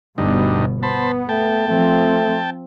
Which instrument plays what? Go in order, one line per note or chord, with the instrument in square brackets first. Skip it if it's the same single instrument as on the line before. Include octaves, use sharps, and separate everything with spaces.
[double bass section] G1 B2 [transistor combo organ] D2 G2 D#4
[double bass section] B3 [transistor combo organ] C5 A5 B5
[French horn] A3 [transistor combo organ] G5 A5
[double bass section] F3 C4 [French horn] A3